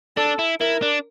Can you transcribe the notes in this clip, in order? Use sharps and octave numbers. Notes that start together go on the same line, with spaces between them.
D4 A4
E4
E4 A#4
D4